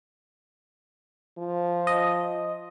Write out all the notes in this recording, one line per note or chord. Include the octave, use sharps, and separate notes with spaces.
F3
D#5